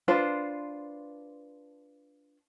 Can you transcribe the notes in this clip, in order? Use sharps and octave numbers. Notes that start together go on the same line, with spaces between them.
D4 F4 B4 C5